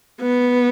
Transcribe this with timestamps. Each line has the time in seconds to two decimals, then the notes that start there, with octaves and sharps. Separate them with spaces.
0.21 B3